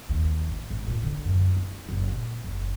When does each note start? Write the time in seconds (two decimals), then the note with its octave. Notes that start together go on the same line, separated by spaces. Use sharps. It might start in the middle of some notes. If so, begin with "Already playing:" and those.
0.09 D#2
0.47 G#1
0.70 G#1
0.87 A#2
1.03 D3
1.25 F#2
1.57 D#4
1.89 F#1
2.09 A#2
2.44 F#1